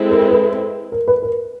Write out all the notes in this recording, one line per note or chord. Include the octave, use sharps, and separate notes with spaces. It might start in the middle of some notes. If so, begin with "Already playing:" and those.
Already playing: G#3 C4 E4 A4
A#4
B4
A#4
B4
A#4